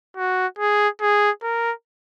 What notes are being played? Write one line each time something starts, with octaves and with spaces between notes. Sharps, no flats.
F#4
G#4
G#4
A#4